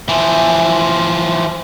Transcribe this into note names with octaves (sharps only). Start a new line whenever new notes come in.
E3 F3